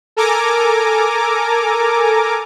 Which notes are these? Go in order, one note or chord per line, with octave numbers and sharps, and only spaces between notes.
A4 A#4 G#5 A#5 D6